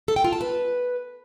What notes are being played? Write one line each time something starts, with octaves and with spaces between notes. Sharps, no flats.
A4
G5
F4
A5
B4